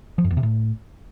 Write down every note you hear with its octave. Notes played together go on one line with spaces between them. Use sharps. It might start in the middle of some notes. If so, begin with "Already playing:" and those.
F3
F#2
E2
C3
A2